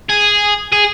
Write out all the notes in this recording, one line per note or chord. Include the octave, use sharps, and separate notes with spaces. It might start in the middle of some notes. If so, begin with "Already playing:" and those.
G#4
G#4